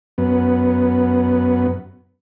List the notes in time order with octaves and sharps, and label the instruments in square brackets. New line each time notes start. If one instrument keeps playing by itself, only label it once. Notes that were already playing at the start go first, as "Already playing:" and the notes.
[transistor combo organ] F#2 B3